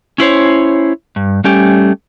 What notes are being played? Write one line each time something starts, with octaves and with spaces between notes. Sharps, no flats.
C#4 E4 C5 C#5
G2
G3 A3 C#4 G4